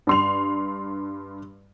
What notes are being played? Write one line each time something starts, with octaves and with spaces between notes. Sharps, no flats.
G2 C6 F7